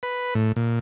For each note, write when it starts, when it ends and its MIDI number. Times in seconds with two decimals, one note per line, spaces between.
0.03 0.34 71
0.35 0.52 45
0.56 0.79 46